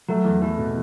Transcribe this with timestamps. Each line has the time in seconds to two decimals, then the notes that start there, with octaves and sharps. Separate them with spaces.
0.09 F#3 A3
0.25 E2
0.41 E3 A3
0.58 B2